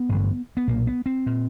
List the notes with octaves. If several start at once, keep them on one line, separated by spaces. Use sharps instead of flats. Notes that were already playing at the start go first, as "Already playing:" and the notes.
Already playing: B3
A1 G2 D3
B3
B1 A#2 A#3
B3
C4
A#2